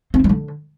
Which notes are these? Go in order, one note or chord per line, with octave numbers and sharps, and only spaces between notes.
C4
F3
G3
D3